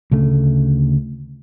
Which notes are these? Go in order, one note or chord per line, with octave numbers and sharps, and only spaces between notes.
D2 C#3 A3